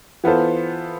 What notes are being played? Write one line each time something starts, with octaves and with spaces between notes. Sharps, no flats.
E3 B3 F4 A4 C5